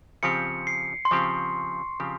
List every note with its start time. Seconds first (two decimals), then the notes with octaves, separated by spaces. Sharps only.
0.23 C#3 F3 C4 G4 C#7
0.67 C7
1.05 C6
1.11 C#3 F3 C4 G4 C#6
2.00 C#3 F3 C4 G4